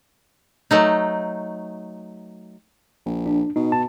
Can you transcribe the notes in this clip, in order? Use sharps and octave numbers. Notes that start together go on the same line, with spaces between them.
F#3 A3 D#4
A#1
D4
B2 D#4
A5